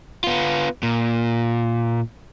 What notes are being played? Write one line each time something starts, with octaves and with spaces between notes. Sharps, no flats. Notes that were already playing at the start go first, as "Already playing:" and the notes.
B3 F4
A#2